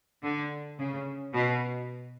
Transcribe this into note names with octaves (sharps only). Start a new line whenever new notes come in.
D3
C#3
B2